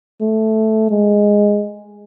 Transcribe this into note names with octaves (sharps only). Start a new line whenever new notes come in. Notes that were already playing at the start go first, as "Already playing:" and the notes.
A3
G#3